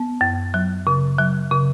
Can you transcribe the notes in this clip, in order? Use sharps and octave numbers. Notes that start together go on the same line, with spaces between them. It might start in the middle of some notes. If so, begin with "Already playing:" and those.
Already playing: B3
F#2
F#3
C#3
F#3
C#3